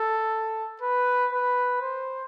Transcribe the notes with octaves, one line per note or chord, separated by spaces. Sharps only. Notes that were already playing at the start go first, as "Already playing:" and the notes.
Already playing: A4
B4
B4
C5